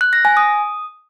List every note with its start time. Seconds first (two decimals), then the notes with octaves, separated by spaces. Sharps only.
0.01 F#6
0.13 A#6
0.25 G#5
0.37 D#6